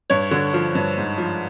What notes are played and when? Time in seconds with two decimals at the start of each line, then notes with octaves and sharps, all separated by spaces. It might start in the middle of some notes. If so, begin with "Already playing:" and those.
0.10 G2 C#5
0.31 D3
0.53 F3
0.75 G2
0.97 G#2
1.18 F3